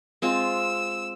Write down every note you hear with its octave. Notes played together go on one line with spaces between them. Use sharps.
G#3 C4 F4 E6